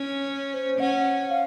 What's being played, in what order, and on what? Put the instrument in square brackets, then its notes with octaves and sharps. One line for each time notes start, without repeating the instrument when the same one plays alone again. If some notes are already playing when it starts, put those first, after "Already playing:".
Already playing: [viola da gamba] C#4
[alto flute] C#5
C5
[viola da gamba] C#4 [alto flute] F#5
[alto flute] F5